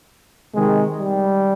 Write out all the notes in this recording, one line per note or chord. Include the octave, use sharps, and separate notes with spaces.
C3 D#3 G#3
G3